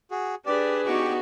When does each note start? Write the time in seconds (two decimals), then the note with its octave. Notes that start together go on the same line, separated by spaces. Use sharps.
0.11 F#4 G#4
0.46 D4 G4 G#4 B4 D5
0.86 B3 D#4 F#4 G4 G5 C#6